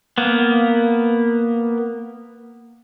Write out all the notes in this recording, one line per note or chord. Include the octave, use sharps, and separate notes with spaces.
A#3 B3